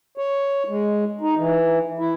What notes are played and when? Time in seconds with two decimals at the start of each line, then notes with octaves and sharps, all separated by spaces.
0.18 C#5
0.69 G#3
1.21 D#4
1.37 E3
1.99 E4